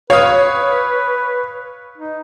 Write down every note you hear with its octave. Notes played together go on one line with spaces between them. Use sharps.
B4 C#5 F5 D#6
D#4